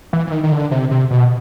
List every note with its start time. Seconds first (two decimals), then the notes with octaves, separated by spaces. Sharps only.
0.13 E3
0.27 E3
0.32 D#3
0.43 D#3
0.52 D3
0.71 C3
0.91 C3
1.11 B2